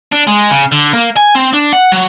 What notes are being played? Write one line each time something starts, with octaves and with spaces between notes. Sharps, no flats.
D4
G#3
C#3
D3
A#3
G#5
C4
D4
F#5
F#3